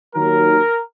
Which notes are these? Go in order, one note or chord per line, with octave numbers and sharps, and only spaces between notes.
D#2 D#3 F#3 A#4